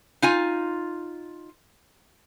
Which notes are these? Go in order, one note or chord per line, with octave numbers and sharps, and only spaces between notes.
D#4 F4 G#5